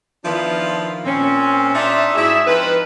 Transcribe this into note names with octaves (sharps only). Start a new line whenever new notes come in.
D#3 F3 B3 D4 E4 F4
A#2 C4 C#4
D4 D#4 F4 E5
G#2 E4 F#4 G#4 E5
F3 C4 D#4 B4